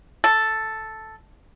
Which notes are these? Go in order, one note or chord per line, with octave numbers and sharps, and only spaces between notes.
A4